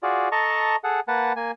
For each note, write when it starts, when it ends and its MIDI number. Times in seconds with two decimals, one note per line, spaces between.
0.03 0.29 65
0.03 0.29 66
0.03 0.29 68
0.03 0.29 74
0.32 0.76 69
0.32 0.76 75
0.32 0.76 81
0.32 0.76 82
0.32 0.76 85
0.84 1.00 68
0.84 1.00 69
0.84 1.00 78
1.08 1.33 58
1.08 1.33 71
1.08 1.33 78
1.08 1.33 81
1.36 1.51 58
1.36 1.51 80